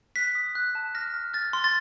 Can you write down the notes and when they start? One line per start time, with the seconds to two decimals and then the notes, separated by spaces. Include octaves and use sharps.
0.16 F#6 B6
0.35 D#6
0.55 F#6
0.75 A5
0.95 F6 A#6
1.14 F6
1.34 F6 A6
1.53 C6
1.64 A6